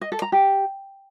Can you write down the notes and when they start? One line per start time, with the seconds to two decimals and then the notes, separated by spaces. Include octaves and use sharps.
0.01 D#5
0.12 A4
0.22 A#5
0.32 G4